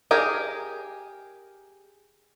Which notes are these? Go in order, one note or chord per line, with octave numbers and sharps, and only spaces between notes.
G4 G#4 A#4